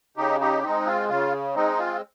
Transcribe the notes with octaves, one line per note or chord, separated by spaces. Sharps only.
C#3 D#4 G4
D#4 G4
G#3 C4 D#4
F4
C#3 F4
G#3 C4 D#4
F4